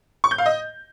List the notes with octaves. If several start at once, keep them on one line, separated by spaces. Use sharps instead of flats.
C#6
G6
F5
D#5